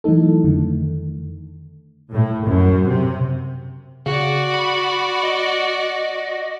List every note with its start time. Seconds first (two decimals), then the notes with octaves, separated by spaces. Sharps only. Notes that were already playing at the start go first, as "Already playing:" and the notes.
0.04 E3 F#3 A3 D#4 A4
0.44 F2 D3 D#3 A3
2.12 A2
2.45 F#2
2.86 C3
4.06 C#3 F#4 D5
4.54 B5
5.23 D#5